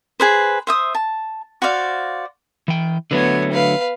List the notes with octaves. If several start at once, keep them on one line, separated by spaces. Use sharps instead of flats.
G#4 B4 C5
C5 E5 D#6
A5
F#4 C5 D5 F5
E3 G5
D3 F#3 A3 B3 C#5
B4 F5